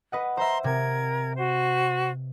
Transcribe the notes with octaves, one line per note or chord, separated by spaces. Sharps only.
B4 D#5 F#5
C5 E5 A#5 C6
C3 A#4 G#6
F#4 C5